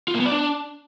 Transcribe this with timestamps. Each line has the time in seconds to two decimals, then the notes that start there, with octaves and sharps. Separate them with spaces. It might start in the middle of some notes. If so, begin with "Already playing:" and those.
0.08 F4
0.14 A#3
0.20 B3
0.26 D5
0.32 D4